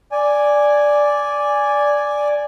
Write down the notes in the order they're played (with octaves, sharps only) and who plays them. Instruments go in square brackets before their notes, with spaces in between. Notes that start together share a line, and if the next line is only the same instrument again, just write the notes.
[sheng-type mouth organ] D5 G#5